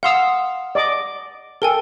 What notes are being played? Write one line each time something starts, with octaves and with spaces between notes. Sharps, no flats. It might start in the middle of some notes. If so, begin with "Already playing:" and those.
F5 F#5 C6 D#6 E6
D5 D#5 D6
A4 A#4 G5 G#5